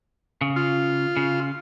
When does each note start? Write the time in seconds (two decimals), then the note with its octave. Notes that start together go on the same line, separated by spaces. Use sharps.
0.41 C#3
0.56 F4
1.17 C#3